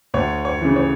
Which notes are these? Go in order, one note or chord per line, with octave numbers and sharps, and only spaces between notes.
D2 C#5
C#5
C#3 E3
C#5